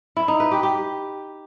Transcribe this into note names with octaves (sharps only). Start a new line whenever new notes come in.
E4
D#4
B4
G4
G4